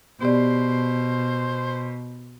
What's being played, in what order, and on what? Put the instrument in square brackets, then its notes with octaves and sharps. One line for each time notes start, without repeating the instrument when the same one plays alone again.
[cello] B2 [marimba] B3 G4 D5 [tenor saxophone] C5